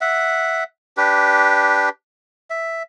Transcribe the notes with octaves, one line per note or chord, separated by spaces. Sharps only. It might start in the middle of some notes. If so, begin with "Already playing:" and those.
E5 F#5
D4 G4 B4
E5